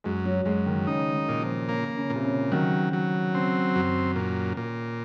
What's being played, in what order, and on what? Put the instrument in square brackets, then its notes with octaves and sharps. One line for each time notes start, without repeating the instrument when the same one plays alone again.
[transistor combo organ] F#2 [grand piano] G#3
[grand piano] F#3
[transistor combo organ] F#2 [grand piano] G#3
[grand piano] D#3
[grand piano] C#3 [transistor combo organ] D#4
[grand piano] D#3
[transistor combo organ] A#2
[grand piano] F3
[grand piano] C#3 [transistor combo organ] A#3
[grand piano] C#3
[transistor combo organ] A#2
[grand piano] C3
C#3
[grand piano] D#3 [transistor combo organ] F#3
[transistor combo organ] F#3
[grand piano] C#3 [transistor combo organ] C4
[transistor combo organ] F#2
A#2
A#2